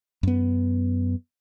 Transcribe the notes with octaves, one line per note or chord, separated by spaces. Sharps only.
F#2 B3